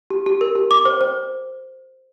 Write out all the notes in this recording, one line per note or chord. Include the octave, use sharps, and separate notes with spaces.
G4
G4
A#4
G4
D6
C5
C5